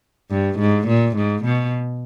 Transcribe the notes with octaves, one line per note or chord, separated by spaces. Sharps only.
G2
G#2
A#2
G#2
B2